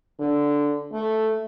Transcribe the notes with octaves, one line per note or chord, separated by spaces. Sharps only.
D3
A3